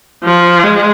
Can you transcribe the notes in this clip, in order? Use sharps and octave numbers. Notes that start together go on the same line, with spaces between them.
F3
G#3